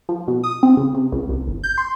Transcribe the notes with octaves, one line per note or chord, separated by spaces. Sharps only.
F3
B2
D#6
C4
C#3
C3
C#2
C2
G1
G6
C6